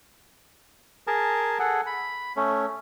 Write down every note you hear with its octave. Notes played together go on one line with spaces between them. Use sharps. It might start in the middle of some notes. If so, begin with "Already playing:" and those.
G#4 A#4 A5
G#4 A4 F#5
B5
A3 C#4